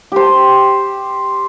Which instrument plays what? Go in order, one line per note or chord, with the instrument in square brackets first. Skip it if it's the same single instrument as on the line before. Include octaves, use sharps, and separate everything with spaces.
[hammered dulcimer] G4 C5